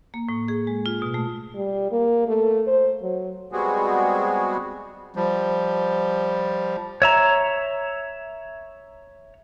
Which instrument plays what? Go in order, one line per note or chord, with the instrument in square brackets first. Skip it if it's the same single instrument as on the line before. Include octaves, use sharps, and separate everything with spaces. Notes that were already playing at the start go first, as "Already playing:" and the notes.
[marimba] A#3
A2
G#4
G#3
F4
B2
A3
[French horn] G3
A#3
A3
C5
F#3
[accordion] G3 G#3 B3 C4 F#4 G#4
[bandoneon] F3 G3
[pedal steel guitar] C#5 E5 A#5